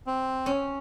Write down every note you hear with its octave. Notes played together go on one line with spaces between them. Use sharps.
C4
C#4